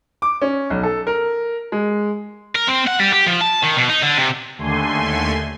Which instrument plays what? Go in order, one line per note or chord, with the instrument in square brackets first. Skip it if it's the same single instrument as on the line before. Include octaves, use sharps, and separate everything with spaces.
[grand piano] D6
C#4
B1
A4
A#4
G#3
[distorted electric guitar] A#4
C4
F#5
G3
G4
F3
A5
D#3
B2
D#4
D3
C3
[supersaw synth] D#2 D3 A3 G#5 C6